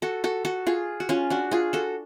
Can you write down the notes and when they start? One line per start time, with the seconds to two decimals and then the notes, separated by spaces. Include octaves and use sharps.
0.02 F#4 A4
0.24 F#4 A4
0.45 F#4 A4
0.67 F4 G#4
1.00 F#4
1.09 C#4 F4
1.30 D4 F#4
1.51 F4 G#4
1.73 F#4 A4